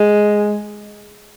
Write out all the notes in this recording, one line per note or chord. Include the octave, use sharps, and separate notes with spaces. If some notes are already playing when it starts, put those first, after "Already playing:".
Already playing: G#3